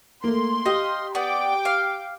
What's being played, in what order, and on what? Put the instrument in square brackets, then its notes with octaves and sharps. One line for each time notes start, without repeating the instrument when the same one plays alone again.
[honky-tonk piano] A3 A#3 [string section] C6
[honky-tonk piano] G4 [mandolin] D#5 F5
[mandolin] B3 D5 [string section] G5 D6
[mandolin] F5